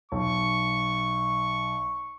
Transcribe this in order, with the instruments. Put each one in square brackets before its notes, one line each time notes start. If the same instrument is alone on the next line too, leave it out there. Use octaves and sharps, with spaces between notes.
[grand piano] B1 [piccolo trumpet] C#6